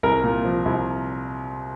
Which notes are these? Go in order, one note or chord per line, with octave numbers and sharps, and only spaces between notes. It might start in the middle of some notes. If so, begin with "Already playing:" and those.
C2 A#4
A#2
F3
C2